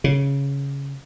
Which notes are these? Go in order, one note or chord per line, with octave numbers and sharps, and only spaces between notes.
C#3